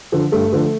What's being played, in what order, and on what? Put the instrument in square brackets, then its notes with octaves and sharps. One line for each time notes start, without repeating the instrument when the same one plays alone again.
[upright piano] D3 F3
G2 A3
D3 F3